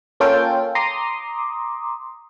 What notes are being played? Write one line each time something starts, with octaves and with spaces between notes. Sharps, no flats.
A#3 C#4 F4 A4 G5
A#5 C6 D6 D#6